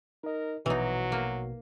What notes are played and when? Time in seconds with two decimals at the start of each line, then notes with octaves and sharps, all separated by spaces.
0.24 D#4 A#4 D#5
0.66 A#1 B2 E3 F#3 D#4
1.12 A#3